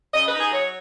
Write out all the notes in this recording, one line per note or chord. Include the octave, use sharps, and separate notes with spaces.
C#3 D#5
B4
D#4
G#4
F#3 C#5